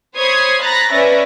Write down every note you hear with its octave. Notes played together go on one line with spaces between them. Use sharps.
C5 C#5 B5 D#6 G#6 C7
A#5 B5 F#6 A6 A#6
C#4 B4 D5 E5 A#6